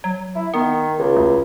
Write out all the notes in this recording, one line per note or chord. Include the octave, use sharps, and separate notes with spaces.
F#3
E4
D#3 B3
C#2
D2